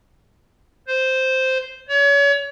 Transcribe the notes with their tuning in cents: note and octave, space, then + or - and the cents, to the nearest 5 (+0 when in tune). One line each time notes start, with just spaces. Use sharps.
C5 -5
C#5 +35